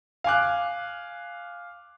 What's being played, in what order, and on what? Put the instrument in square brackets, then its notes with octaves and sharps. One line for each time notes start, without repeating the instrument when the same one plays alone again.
[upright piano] F5 G#5 D6 F#6